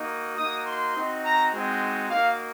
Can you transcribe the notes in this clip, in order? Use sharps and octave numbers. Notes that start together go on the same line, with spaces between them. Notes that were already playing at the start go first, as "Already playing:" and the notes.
Already playing: A#3 D#4 F#4
A#3 D#4 F#4 D#6
C6
C4 D#4 F#4
A#5
G#3 C4 D#4 F#4
A#3 D#4 F#4 F5